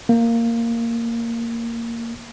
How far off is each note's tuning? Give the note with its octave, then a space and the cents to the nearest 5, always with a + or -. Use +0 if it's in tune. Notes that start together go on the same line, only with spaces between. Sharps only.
A#3 -10